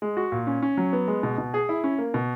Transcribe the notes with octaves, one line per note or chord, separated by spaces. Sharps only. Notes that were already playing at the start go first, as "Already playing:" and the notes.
G#3
F#4
A#2
C#4
C#4
F#3
B3
G#3
B2
B2
G#4
E4
C#4
A#3
B2